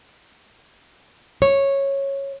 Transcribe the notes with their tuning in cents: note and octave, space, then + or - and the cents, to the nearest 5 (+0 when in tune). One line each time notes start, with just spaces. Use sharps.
C#5 -10